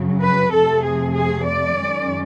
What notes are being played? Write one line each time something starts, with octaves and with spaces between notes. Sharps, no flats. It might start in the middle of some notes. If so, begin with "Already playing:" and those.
Already playing: F#2 C#3 F#3
B4
F2 C3 F3 A3 A4
G#4
G#4
D5
F#2 D#3 G#3 C#4